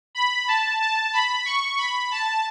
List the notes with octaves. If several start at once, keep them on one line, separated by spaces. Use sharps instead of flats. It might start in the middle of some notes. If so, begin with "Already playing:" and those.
B5
A5
A5
B5
C#6
B5
A5